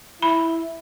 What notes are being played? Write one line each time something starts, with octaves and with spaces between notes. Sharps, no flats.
E4 B5